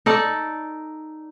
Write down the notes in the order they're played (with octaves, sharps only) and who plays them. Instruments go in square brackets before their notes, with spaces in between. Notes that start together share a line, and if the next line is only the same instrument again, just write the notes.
[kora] D#4 A4 D5